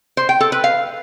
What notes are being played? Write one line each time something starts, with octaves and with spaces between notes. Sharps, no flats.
C5
G5
A4
B4
F5